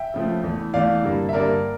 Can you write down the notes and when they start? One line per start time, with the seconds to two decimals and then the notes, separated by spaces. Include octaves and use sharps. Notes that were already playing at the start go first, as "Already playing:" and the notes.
Already playing: E5 G5
0.14 C#3 F3 A3
0.43 E2 E3 A3
0.74 E2 E3 A3 D5 F5
1.03 G2 D3 G3 A#3
1.29 E5
1.33 G2 D3 G3 A#3 A#4 D5